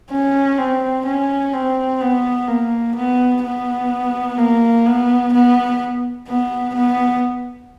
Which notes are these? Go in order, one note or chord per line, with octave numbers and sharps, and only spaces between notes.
C#4
C4
C#4
C4
B3
A#3
B3
B3
A#3
B3
B3
B3
B3